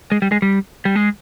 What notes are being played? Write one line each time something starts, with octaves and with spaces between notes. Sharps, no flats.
G#3
G3
G#3
G3
G3
G#3